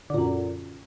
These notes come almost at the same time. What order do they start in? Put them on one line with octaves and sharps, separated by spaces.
D3 A#2 F#2